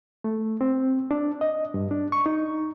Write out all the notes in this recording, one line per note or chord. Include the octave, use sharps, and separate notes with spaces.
A3
C4
D4
D#5
G2
D4
C#6
D#4